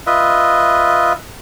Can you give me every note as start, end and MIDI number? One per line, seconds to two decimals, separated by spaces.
0.07 1.13 65
0.07 1.13 71
0.07 1.13 75
0.07 1.13 76